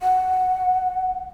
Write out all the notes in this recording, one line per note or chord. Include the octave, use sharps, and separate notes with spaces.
F#5